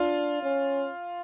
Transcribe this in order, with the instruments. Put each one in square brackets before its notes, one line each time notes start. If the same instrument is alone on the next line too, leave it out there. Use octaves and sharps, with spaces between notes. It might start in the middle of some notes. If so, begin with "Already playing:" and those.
Already playing: [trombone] D4 [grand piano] F4
[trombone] C#4